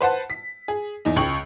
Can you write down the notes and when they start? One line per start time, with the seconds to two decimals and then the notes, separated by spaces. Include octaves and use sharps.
0.01 B4 C5 F#5 A5
0.30 B6
0.68 G#4
1.05 E2 D#4
1.16 C#2 G5 C#6 F#7